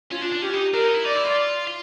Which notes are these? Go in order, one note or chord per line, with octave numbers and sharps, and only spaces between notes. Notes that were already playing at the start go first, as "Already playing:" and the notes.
C#4 F4
D4
D4
C#4 G4
D#4
D4 A#4
D#4
E4
D#4 D5
E4
F4
F4